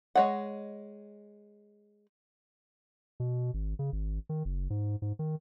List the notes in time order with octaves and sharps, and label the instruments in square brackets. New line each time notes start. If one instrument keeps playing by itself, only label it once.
[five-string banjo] G#3 C#5 D#5 F#5
[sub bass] B2
G#1
C#3
G#1
D#3
F#1
G#2
G#2
D#3